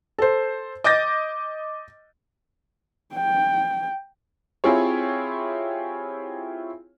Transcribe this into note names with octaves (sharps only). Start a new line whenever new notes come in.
A4 C5
D#5 D6 G6 A6 A#6
G5
C4 E4 F4 G4 G#4 C#5